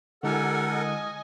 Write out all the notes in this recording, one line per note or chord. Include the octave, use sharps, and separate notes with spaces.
D3 G#3 E4 G4 A4 A#4 F#5 G#5
D#5 G#5